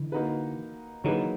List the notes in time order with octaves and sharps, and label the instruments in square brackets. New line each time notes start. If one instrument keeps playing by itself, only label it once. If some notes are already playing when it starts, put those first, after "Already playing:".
Already playing: [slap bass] D3 E3
[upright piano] A#3 D#4 F#4 B4
[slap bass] D3 E3 [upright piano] F#3 A#3 D#4 G#4 B4